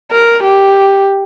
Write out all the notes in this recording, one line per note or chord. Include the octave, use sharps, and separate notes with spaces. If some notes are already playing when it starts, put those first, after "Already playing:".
A#4
G4